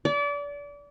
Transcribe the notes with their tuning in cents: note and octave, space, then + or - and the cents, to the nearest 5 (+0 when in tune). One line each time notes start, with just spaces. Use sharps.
D5 -30